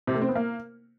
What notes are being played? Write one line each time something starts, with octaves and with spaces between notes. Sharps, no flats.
C3
A3
C4
B3
A#3